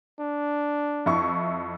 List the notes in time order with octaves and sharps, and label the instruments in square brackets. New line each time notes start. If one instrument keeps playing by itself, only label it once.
[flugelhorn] D4
[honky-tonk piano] F2 E4 C#6